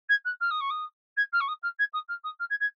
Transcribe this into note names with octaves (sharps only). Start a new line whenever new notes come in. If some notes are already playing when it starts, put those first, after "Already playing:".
G#6
F#6
F6
D#6
C#6
D#6
G#6
F6
C#6
D#6
F6
G#6
D#6
F6
D#6
F6
G#6
G#6